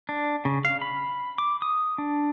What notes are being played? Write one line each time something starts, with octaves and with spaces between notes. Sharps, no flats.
D4
C#3
F5
B5
D6
D#6
D4